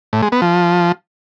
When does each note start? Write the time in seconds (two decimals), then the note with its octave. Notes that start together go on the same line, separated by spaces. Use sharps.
0.13 A2
0.23 G#3
0.32 B3
0.42 F3